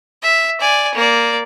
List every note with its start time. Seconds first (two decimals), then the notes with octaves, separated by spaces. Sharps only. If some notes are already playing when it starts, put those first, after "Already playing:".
0.23 E5
0.61 D5 G#5
0.95 A#3 D5